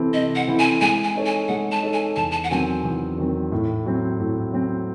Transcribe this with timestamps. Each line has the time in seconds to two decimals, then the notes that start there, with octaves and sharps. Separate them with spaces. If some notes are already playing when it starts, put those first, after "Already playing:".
Already playing: C3 E3 C4 E4 A4
0.14 C3 D#5
0.35 F#5
0.48 E3 C4 E4 A4
0.59 G#5
0.81 G#3 G#5
1.04 G#5
1.15 D#4 A4 C#5
1.26 G#5
1.48 G#3 F#5
1.72 A5
1.83 D#4 A4 C#5
1.93 G#5
2.16 E2 A5
2.31 A5
2.44 F#5
2.50 D#3 F#3 C4 G#5
2.84 E2
3.18 D#3 F#3 C4
3.52 A2
3.86 F#3 C4
4.20 A2
4.53 F#3 C4